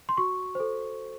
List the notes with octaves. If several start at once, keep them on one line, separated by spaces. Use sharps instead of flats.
C6
F#4 C#6
A4 C5